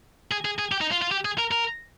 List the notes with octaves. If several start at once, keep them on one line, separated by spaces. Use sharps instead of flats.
G#4
G#4
G#4
G4
D#4
F4
F4
G4
G#4
A#4
A#4